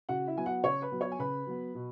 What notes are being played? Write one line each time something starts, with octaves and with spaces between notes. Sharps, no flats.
C#3 F#4 F#5
E4 E5
F#3 B3 G#5
F#4 F#5
C#3 C#5 C#6
B4 B5
F#3 B3
C#5 C#6
G#5
C#3 B4 B5
F#3 B3
B2